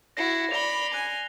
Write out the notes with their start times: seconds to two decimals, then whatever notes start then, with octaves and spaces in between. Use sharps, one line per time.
0.17 E4 F#4 A#6 C7 C#7
0.51 D5 B5 F7 G7
0.94 G#5 F#6